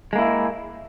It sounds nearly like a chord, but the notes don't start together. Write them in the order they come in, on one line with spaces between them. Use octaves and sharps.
G#3 A#3 E4